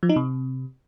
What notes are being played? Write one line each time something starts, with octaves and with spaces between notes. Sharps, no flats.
F3
D#4
C3